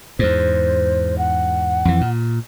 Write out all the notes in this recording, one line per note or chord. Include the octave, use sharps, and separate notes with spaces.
E2 G#2 C5
F#5
F2 E3
A#2